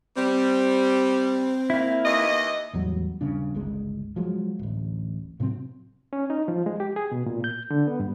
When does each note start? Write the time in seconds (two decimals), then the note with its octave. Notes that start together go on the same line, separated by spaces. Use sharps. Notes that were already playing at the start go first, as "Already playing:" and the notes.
0.17 G3 C4
1.70 A#3 E4
2.05 D#2 E3 D#5
2.73 A1 E2 F#3 G3
3.21 D#1 G2 C#3 D4
3.54 G1 C#2 G#3
4.16 F3 F#3 G#3
4.59 D1 A1
5.40 A2 C3 F#3 C4
6.13 C#4
6.30 D#4
6.48 F3
6.66 G#3
6.80 G4
6.96 G#4
7.12 B2
7.26 A#2
7.44 G6
7.71 D3
7.87 B3
8.00 G2